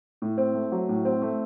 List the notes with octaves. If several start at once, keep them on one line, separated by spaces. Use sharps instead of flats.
A2
C4
A3
F#3
A2
C4
A3